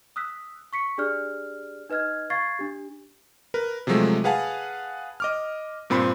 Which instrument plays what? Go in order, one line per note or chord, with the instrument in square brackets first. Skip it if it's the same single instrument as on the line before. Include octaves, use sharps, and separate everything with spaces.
[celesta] D#6 E6 F#6 B6
C#6 B6 C#7
D4 G4 G#4 D5 F6 F#6
D#4 B4 D#5 F6 G#6
F5 C#6 G#6 A6 C7
D4 G4
[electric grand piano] A#4 B4
C3 F3 F#3 G#3 A3
G#4 B4 F5 F#5 G#5 A5
D#5 D6 F6
G2 A#2 C4 B5 C6